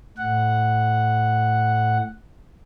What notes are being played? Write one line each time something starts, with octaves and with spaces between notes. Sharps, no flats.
A2 F#5